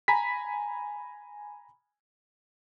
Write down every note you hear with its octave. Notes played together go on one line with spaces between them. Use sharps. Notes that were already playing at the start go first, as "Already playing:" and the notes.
G#5 A#5 B5 B6